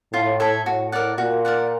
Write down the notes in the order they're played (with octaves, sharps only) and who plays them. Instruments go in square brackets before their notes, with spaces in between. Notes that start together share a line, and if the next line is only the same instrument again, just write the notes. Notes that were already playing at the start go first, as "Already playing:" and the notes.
[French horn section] A2 [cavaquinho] F4
[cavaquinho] A4 C#5 E5
[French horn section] A2 [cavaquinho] F#4
[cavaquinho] A#4 D5 F#5
[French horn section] A#2 [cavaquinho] F#4
[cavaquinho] A#4 D5 F#5